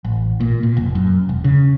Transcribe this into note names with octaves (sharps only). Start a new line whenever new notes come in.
A1
A#2
A#2
F1
F#2
E1
C#3